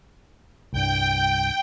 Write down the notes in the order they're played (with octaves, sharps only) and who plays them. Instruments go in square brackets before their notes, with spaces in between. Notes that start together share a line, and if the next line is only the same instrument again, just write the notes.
[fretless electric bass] C2 G2 [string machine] G5